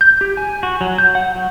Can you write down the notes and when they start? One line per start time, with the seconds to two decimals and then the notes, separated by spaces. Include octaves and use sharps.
0.01 G6
0.21 G4
0.37 G#5
0.63 F#4
0.81 F#3
0.98 G6
1.15 F#5
1.35 F#3